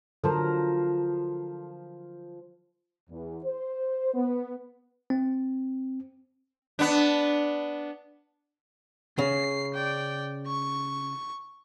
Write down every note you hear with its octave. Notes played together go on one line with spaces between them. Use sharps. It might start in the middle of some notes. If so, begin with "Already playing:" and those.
D3 F3 F#3 A4 A#4 C5 A5 C6
E2
C5
B3
C4
B3 D4
C#3 C7
D5 G5
C#6